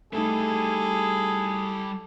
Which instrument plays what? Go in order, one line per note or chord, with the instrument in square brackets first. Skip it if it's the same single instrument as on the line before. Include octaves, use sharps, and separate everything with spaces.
[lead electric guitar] G3 E4 [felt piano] A3 D#4 [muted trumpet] G#4 [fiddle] A4